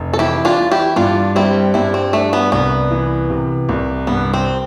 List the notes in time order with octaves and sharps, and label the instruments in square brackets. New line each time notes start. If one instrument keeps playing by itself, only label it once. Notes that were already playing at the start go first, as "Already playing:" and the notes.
Already playing: [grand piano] F1
[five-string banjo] A4
[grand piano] E3 [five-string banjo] E4 G4
[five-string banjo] D4 F4
[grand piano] E3
[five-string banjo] E4 G4
[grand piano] G2 [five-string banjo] D4 F4
[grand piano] G3 [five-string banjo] C4 E4
[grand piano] G2 [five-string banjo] C4 E4
[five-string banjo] C4
[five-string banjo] A3 [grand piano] D4
[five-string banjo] B3
[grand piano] C2 [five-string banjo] B3
[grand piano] E3
C3
C2
[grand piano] G2 [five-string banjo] B3
[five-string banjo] C4